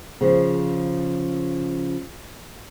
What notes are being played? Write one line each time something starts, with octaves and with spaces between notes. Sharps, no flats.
C#3 F3